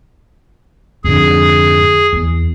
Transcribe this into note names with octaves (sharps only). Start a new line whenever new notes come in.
F2 G#2 D3 G#4
E2